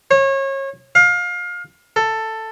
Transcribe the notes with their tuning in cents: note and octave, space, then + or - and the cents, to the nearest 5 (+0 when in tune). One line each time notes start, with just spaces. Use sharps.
C#5 -30
F5 +25
A4 +10